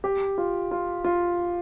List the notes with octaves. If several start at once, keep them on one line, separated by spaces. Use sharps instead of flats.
G4
F4
F4
F4